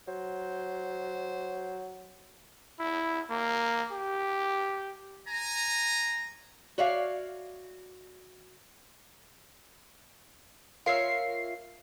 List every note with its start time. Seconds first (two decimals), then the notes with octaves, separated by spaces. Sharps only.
0.08 F#3 C5
2.79 E4
3.30 A#3
3.92 G4
5.28 G#5 A#5
6.78 F#4 C#5 D5 E5 F5
10.86 F4 A#4 C#5 E5 C7